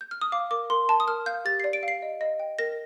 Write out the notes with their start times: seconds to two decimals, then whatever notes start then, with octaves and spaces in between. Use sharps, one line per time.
0.01 G6
0.11 F6
0.21 D#6
0.32 F5 D6
0.51 A#4 D6
0.70 A#4 C6
0.89 A#4 A5
1.00 D#6
1.07 A#4 F6
1.26 F5 G6
1.45 G4 A6
1.60 C7
1.64 D5
1.73 D7
1.83 F5
1.88 C7
2.02 D#5
2.21 D#5
2.40 G5
2.59 A#4 A#6